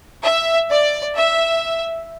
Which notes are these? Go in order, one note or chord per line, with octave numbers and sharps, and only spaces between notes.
E5
D5
E5